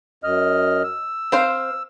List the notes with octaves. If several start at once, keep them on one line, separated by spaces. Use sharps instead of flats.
F#2 D#5 F6
E6
C4 C5 F5